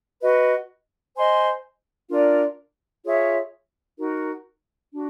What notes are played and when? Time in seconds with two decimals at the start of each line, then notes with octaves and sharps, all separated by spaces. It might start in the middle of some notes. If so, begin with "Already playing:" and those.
0.21 F#4 B4 D#5
1.16 C5 D#5 G#5 C6
2.09 D4 F4 A#4 D5
3.04 F4 G#4 C#5 E5
3.98 D#4 F#4 A#4
4.92 D4 F#4